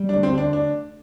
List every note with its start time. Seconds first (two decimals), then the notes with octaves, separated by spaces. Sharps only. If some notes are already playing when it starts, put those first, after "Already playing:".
Already playing: G3
0.09 D4
0.13 D2
0.23 C4
0.33 D3
0.38 D4
0.53 D4